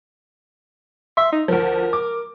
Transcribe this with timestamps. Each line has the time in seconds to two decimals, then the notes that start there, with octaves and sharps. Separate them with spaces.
1.17 E5 C6
1.32 D#4
1.48 D2 F3 A#4
1.93 D6